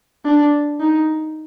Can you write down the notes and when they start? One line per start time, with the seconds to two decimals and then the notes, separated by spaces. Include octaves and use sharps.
0.25 D4
0.80 D#4